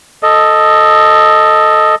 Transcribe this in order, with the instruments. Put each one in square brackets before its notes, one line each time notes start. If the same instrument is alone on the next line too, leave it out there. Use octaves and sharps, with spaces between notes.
[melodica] A4 D#5